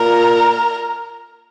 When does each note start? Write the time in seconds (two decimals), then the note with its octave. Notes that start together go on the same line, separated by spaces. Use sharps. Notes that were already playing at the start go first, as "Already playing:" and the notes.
Already playing: A#2 A#4